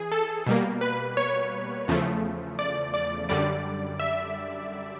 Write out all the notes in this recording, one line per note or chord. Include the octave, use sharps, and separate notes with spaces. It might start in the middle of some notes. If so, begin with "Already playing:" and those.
Already playing: E3 G#4
A4
B2 G3 A#3
B4
C#5
E2 C#3 F3 A3
D5
D5
F#2 D3 G3 D5
E5